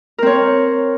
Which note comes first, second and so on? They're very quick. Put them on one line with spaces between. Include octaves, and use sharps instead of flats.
A#4 C4 C#5